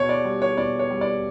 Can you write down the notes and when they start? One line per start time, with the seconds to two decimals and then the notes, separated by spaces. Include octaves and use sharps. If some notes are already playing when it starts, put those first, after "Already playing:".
Already playing: B2 C#5
0.09 D5
0.25 G3
0.42 C#5
0.57 B2 D5
0.79 C#5
0.90 G3
1.01 D5